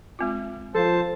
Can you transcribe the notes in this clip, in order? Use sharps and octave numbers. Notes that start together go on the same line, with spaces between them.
G#3 C4 F4
F3 A4 C5 A5